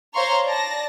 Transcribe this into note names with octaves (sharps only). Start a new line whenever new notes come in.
C5 C#5 F5 A#5 C6 C#6
D5 A5 A#6